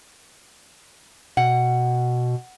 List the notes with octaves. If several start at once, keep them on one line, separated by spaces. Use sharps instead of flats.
B2 F#5